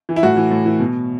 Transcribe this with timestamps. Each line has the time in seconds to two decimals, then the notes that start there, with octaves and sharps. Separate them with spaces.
0.09 E3
0.16 E4
0.23 A2 F#4
0.37 E3
0.51 A2
0.66 E3
0.80 B2